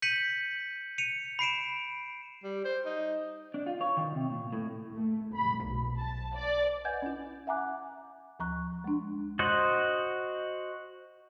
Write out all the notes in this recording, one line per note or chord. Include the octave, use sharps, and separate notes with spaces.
G6 B6 C#7 D#7 F#7
C#7 D#7 F7
B5 C7 D7 E7
G3
C5
D#4
D4
F4
C#5
D#3
C3
A#2
A2
A3
B5
B1
A5
D5
B4 D#5 F#5 G#5 G6 G#6
C#4 E4
E5 F#5 G#5 A#5 D6 F#6
D2 F3 A#5 C#6 F#6
G#3 D4
F#4 C5 D#5 F#5